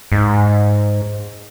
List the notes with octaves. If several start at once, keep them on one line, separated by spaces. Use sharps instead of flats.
G#2